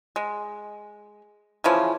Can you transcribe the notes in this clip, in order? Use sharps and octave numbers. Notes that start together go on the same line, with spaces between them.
G#3
C#3 E3 F3 C#4